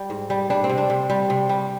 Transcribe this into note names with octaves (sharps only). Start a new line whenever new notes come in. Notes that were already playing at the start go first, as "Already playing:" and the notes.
Already playing: G3
G#2
G3
G3 D4
C4
C3
D4
C3
G3
C3
G3